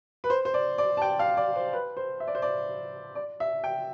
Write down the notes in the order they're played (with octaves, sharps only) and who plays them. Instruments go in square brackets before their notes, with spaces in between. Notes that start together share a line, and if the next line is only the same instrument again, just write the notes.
[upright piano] B4
C5
C5
D5
D5
A5
G5
F5
D5
C5
B4
C5
E5
D5
C5
D5
D5
E5
G5